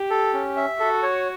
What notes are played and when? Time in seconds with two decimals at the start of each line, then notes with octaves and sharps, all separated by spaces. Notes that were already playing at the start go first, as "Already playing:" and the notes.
Already playing: G4
0.10 A4
0.34 C#4
0.57 E5
0.80 F#4 A4
1.03 C#5